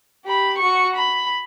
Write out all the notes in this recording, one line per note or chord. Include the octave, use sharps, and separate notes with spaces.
G4 B5
F#4 C#6
B5